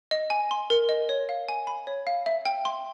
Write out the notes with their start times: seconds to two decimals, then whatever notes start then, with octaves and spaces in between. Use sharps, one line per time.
0.11 D#5
0.30 G#5
0.51 C6
0.70 A#4
0.89 D#5
1.09 C#5
1.29 F5
1.49 G#5
1.67 B5
1.87 C#5
2.07 F5
2.26 E5
2.45 G5
2.65 C6